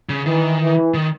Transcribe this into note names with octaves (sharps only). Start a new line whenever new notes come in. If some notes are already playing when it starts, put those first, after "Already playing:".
C#3
D#3 E3
E3
D#3